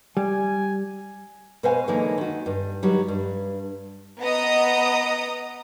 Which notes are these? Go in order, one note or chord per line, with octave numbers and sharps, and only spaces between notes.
G3 G#5
B2 G#3 B4 C5 F5 G#5
D3 E3 F#3 G#3 A#3 D#4
D#3 F#4
G2
D#3 F#3 G3
G2
B3 D#5 A#5 D#6